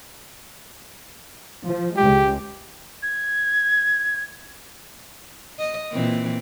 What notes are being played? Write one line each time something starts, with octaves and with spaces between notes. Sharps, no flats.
F3
C#2 G#3 G4
G#6
D#5
A#2 E3 C4